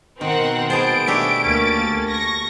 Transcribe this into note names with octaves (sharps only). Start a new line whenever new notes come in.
B2 D#3 C4 A#4 F#5
B3 G#4 C5 A5 D7
A3 D4 G4 E5
D2 A#3 C#4 A6
C#6 A#6